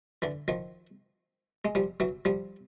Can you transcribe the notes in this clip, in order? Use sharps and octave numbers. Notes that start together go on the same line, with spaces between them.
D3 E3
D#3 F3
G#3
F3 G3
E3 F#3
F3 G3